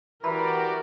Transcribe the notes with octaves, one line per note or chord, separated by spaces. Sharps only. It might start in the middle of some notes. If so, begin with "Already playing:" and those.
E3 F#4 G4 A#4 D5 B5